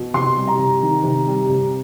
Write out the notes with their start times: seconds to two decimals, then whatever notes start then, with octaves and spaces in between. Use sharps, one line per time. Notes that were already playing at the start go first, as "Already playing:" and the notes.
Already playing: B2
0.14 C3 C6
0.36 G3
0.48 A#5
0.59 C3
0.82 D#3
1.03 C3
1.27 G3
1.49 C3